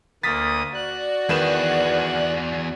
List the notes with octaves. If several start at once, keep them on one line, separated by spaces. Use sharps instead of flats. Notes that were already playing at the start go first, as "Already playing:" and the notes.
D2 A#3 D#6 A6 B6
F#4 D5 F#6
E2 D#3 G#4 B4 E7